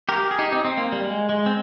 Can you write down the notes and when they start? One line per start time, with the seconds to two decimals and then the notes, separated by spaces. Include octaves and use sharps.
0.09 G4 A#4
0.31 G#4
0.39 D#4 G4
0.52 C4 D#4
0.65 C4
0.77 A#3
0.92 G3
1.04 G#3
1.29 G#3
1.46 C4